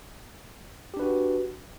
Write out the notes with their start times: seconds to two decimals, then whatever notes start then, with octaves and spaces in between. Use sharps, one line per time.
0.94 G4
0.97 D4
0.99 B4
1.02 F#4